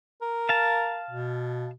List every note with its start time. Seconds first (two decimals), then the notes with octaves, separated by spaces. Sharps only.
0.22 A#4
0.49 F5 A5
1.11 B2